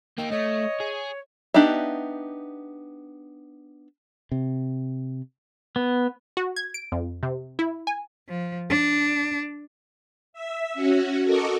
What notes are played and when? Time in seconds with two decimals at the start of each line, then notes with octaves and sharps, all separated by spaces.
0.18 A#3 D#4 G5
0.31 A3 C#5 D#5
0.80 G#4
1.54 B3 D4 D#4 G4 E5
4.32 C3
5.76 B3
6.37 F#4
6.56 G#6
6.74 D7
6.92 F2
7.23 C3
7.59 E4
7.87 G#5
8.29 F3
8.70 D4
10.33 E5
10.74 C#4 F#4
11.23 F#4 A4 A#4 D#5 C#6 D6